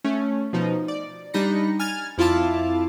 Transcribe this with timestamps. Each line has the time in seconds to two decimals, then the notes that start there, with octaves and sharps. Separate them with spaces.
0.04 A3 C#4
0.53 B2 F3 D#4
0.88 D5
1.34 G3 D4 D#4 B5 A#6 C#7
1.79 G#5 F6 G#6 A6
2.18 F2 E4 F4 F5 A5 D6